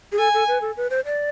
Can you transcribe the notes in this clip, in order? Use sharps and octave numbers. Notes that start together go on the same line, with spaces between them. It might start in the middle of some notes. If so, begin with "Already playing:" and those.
G#4
A4 G#5
A4
B4
A4
B4
C5
D5